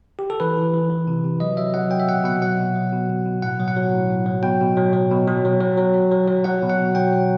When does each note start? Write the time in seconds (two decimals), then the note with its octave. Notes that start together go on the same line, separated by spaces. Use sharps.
0.19 G4
0.30 A4
0.40 E3 B4
0.57 E3
0.74 E3
0.90 E3
1.07 C3
1.24 C3
1.40 F#3 D#5
1.57 F#3 E5
1.74 F#3 F#5
1.91 F#3 G5
1.99 E5
2.08 B2 F#5
2.24 B2 F#5
2.42 F#3 F#5
2.59 B2
2.75 F#3
2.93 B2
3.09 B2
3.26 B2
3.42 A2 F#5
3.60 F#3
3.68 F#5
3.77 F#3
3.93 A2
4.10 A2
4.26 F#3
4.43 B2 G5
4.61 B2
4.77 F#3
4.93 F#3
5.11 B2
5.28 F#3
5.45 F#3
5.61 F#3
5.77 F#3
5.94 F#3
6.11 F#3
6.28 F#3
6.44 F#3 F#5
6.62 B2
6.70 F#5
6.78 B2
6.95 F#3 G5
7.13 F#3